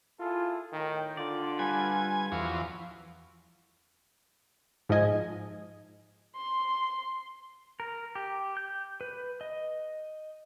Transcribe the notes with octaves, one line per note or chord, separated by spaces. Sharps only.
E4 F4 G#4 A4
A2 D#3 G5
D3 F4 D5
G3 B4 G#5
E2 F3 F#4
G#2 F3 G#3 D#5 G#5
C6
A#4
G4
G6
B4
D#5